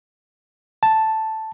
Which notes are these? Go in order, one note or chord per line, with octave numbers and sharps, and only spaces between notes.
A5